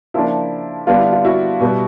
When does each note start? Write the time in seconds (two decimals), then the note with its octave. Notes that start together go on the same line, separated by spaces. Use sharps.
0.14 C#3 F3 A#3 D4 E4
0.87 D3 G3 B3 D4 F4
0.99 E4
1.12 F4
1.25 E4 F#4
1.60 B2 G3 B3